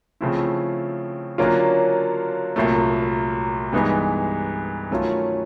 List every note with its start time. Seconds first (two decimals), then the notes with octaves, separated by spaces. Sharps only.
0.21 C#3 F3 A3 C4 E4
1.38 D3 F#3 A#3 C#4 F4
2.56 C2 A#2 F#3 A3
3.73 G2 E3 G#3 B3 D#4
4.91 D#3 F#3 A3 C#4 F4